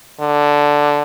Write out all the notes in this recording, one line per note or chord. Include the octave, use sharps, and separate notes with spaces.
D3